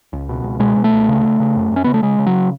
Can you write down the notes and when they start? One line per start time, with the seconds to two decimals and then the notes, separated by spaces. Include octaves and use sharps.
0.13 C#2
0.29 B2
0.44 C#2
0.60 B2 G#3
0.76 B2
0.84 A3
0.92 C#2
1.08 C#3
1.24 C#3
1.40 C#3
1.56 F#2
1.71 F#2 C#4
1.84 C#3 B3
1.94 A3
2.02 C#3 G#3
2.19 C#3
2.27 F#3